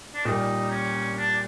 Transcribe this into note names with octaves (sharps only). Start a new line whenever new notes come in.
D4
A#2 G3 A#3 D#4
C#4
D4